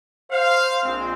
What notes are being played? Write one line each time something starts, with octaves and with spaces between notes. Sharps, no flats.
C5 F5
A#1 A#2 G#3 C4